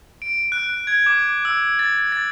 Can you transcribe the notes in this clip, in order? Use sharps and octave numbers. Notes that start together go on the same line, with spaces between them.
D7
F#6
G#6
D6
E6
A6
A6